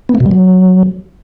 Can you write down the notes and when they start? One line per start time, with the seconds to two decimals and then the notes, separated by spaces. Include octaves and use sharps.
0.09 B3
0.15 A3
0.20 B2
0.26 G3
0.31 F#3